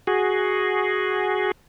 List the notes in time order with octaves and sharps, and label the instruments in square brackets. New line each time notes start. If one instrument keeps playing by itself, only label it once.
[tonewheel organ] F#4 G#4